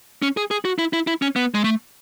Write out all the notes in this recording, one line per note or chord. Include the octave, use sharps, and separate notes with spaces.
C#4
G#4
G#4
F#4
E4
E4
E4
C#4
B3
G#3
A3